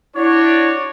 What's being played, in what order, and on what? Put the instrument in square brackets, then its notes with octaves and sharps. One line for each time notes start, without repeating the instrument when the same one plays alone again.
[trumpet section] D4 F#4 C#5 [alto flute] E4